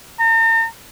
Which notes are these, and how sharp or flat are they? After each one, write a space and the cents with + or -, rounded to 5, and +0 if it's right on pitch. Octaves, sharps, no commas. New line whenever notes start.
A#5 -45